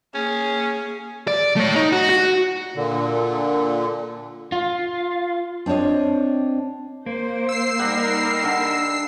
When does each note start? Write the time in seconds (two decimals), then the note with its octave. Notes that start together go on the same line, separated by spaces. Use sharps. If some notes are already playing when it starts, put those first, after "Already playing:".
0.15 A#3 C#4 G#4
1.28 D5
1.56 A3 C#5
1.76 D#4
1.92 F#4
2.09 F#4
2.76 A#2 D3
4.52 F4
5.66 C4 D4 C5 C#5 D#5
7.06 A#3 C5
7.49 E6 C7
7.79 G3 D#4 A#4 F#5
8.43 D3 F5